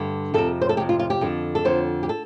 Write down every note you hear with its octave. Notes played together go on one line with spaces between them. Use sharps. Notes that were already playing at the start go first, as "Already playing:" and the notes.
Already playing: G2 D3
F2 C3 A4
C5
A4
F2 C3 G4
F4
F4
G4
F2 D3
A4
F2 D3 C5
G4
A4